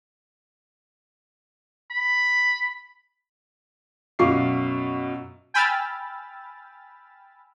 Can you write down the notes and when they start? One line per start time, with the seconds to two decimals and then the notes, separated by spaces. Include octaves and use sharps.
1.91 B5
4.19 F#2 B2 F5 C#6 D6 C7
5.54 G5 G#5 B5 E6 F6 A6